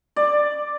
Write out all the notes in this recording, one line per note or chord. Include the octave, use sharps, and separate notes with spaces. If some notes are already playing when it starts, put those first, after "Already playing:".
D5